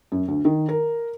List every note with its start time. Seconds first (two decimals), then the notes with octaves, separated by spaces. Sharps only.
0.12 F#2
0.28 D2
0.45 D#3
0.69 A#4